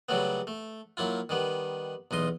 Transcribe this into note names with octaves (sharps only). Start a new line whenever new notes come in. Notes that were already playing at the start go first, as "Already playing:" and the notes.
C#3 F#3 G3 A3 B3
A3
F#3 A#3 E4 F4
D#3 G3 B3
B1 E2 D#5 C6